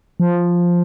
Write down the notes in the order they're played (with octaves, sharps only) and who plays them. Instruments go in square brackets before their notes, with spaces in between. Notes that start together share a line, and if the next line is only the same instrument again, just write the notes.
[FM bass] F3